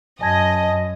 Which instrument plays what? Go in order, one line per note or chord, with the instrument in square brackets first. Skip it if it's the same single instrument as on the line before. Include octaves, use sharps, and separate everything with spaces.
[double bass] F#2 [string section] D#5 [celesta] G#5 A5 G#6